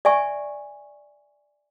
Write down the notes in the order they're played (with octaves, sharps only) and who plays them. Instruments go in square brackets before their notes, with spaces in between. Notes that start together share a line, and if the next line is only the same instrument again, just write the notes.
[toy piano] D5 E5 G#5 C#6